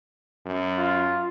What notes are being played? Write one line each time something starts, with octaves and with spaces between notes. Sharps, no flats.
F#2
F4